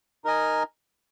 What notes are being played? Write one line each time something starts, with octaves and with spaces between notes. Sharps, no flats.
D#4 A#4 D#5 G#5